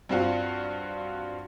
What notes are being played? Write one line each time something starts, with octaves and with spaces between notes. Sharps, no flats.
G2 C4 F4 F#4